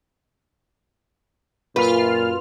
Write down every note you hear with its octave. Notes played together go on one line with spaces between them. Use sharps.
F#2 A#2 F4 B4 F6